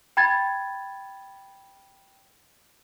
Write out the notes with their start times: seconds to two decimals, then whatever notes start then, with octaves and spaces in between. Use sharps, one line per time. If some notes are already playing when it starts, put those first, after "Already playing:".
0.17 G5 B5 G#6 A6